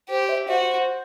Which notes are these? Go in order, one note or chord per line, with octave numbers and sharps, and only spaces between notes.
G4 C5
E5
F#4 C5